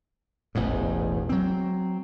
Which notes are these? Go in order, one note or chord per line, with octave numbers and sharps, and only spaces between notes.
E1 A1 E2 G#2
F#3 C4